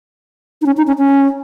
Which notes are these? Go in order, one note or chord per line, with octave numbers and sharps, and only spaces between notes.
D#4
C#4
D#4
C#4
C#4